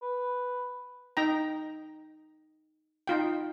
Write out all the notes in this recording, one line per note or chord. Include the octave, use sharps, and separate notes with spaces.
B4
D#4 G5 A#5
D#4 F4 G5